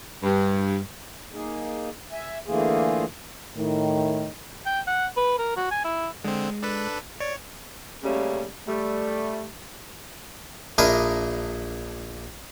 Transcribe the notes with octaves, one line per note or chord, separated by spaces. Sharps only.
G2
A#3 D#4 G#4
E5 G#5
D3 E3 A3 A#3 F4 G#4
A2 D#3
G5
F#5
B4
A#4
F#4
G#5
E4
D3 G#3 C4
D4 A4 B4
C#5 D5
C#3 G3 A3 A#3 C#4
G3 A3
A#1 D4 E4 A#4 D#5 D#6